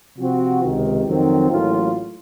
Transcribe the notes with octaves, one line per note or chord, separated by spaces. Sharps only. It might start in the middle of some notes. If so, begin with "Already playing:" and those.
C3 F3 C4 F#4
C#2 C3 D#3
F2 D#3 F#3 C4
A1 A2 F#3 A#3 F4